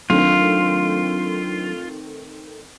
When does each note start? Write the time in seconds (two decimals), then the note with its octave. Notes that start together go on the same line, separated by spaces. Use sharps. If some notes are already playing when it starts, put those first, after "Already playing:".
0.10 D#3 F#3 A3 C4 D4 F4